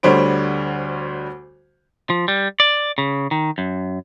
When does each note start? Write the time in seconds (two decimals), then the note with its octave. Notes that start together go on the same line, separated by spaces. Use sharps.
0.03 D2 D3 G3 C5 C#5 D7
2.10 F3
2.28 G3
2.60 D5
2.98 C#3
3.31 D#3
3.58 F#2